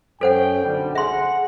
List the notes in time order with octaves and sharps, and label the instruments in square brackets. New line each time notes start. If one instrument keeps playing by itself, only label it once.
[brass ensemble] F#2 C#4 G5 [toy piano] A4 C5 F#5
[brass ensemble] B1 D3 G3
[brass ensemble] G#4 F#5 [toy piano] E5 C6